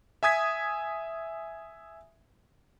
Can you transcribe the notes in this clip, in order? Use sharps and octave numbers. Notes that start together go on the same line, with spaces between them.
E5 G#5 D#6 G#6 B6